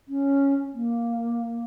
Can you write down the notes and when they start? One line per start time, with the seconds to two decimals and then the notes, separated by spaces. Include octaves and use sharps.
0.08 C#4
0.74 A#3